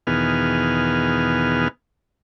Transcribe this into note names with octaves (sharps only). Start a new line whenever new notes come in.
E2 B2 D#3 B3 G#4 F6